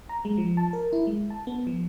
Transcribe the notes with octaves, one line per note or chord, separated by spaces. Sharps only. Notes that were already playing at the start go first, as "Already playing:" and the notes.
A#5
G#3
F3
A5
A#4
E4
G#3
A5
B3
F3